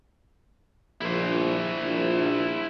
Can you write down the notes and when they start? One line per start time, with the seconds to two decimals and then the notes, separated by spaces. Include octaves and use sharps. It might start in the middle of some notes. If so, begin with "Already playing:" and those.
1.01 A#1 E4 C5
1.81 A#1